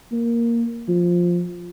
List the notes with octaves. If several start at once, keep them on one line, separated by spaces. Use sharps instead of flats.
A#3
F3